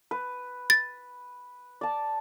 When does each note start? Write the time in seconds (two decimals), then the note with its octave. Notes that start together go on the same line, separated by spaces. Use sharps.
0.11 B4
0.70 A6
1.81 D5 A5